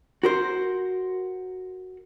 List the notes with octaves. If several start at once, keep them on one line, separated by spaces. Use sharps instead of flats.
F#4 A#4 C5